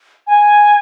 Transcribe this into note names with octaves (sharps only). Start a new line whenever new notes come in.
G#5